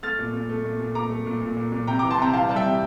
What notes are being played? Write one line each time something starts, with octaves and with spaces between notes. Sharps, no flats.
A3 F6 A6
A#2
A#2
A3
A#2
A#2
A#2 A#5 D6
A3
A#2
A#2
A#2
A#2
C3 G5 A#5
A#5 D6
E3
A5 C6
C3 G5 A#5
E3 F5 A5
G3 A5
E5 G5
C3